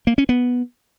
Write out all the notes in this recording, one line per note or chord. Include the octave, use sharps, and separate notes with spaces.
A#3
C#4
B3